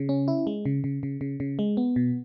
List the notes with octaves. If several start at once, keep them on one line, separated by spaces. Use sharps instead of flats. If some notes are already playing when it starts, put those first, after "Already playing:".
Already playing: C#3
C#4
E4
G#3
C#3
C#3
C#3
C#3
C#3
G#3
B3
B2